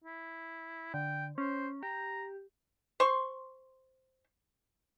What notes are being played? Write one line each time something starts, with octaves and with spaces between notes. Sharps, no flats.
E4
D3 G5
C#4 C5
G4 A#5
C5 C6 C#6